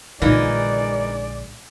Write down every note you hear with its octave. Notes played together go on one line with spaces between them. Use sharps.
A#1 D3 E3 G#3 A#3 D#4 D5